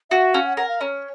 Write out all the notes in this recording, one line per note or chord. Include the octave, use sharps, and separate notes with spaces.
F#4 E5
C#4 F5
F#5
A#4 F#5
F5
C#4 C#5